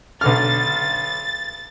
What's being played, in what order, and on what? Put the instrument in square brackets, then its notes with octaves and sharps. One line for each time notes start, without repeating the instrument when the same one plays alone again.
[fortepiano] B1 D3 F6 [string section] A6